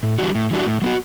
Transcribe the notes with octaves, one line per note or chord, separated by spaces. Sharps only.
A2
E3 G3 D4 F#4
A2
E3 G3 D4 F#4
A2
F#3 B3 F#4